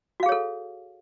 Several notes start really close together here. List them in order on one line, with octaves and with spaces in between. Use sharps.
F#4 F5 G#4 C#5 A4